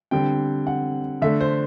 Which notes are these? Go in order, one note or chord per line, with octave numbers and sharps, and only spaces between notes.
D3 G3 C4 G5
F#5
D3 A3 D4 E5
C5